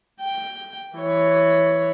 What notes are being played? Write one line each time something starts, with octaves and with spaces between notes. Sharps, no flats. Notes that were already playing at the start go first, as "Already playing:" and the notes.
G5
E3 C#5